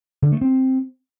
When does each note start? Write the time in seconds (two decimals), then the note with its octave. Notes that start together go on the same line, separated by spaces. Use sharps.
0.22 D3
0.32 A3
0.41 C4